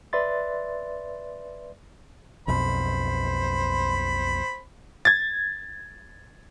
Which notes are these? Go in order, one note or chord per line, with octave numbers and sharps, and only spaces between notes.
B4 D5 E5 C6 A6
B1 F2 B2 C5 B5
G#6 A6